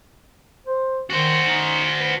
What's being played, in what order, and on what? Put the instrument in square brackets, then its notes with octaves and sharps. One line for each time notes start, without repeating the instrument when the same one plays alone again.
[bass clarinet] C5
[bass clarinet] D#3 [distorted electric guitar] F#4 C5
[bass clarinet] D#4
B4